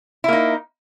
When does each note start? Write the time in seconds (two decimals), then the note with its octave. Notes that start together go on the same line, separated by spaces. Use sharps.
0.24 E4
0.28 A#3
0.33 D#4